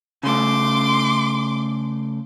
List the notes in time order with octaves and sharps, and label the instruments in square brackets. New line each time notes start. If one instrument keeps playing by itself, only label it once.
[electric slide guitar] C#3 A3 [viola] C6 D6